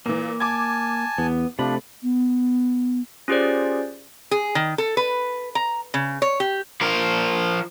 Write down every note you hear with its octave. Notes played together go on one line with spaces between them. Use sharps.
A#2 E3 A#3
G#5 A5 D6 G#6
E2 B3
C3 F3 A3 D4 B5
B3
C#4 F4 G4 G#4 C5 D5
G#4
D#3
A4
B4
A#5
C#3
C#5
G4
F3 A#4